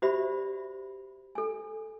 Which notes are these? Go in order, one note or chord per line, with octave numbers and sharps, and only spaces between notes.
F#4 G4 C5 D5 E5 B5
A4 G#5